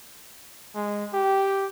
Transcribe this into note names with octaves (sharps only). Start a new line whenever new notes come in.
G#3
G4